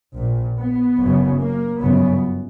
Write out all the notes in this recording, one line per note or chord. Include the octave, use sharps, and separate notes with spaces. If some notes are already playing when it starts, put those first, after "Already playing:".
A#1 A#2
B3
F#1 F#2 C#3
A#3
G1 F#2 C#3 B3